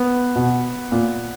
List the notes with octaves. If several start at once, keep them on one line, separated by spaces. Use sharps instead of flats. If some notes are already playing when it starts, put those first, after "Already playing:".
Already playing: B3
B2
A#2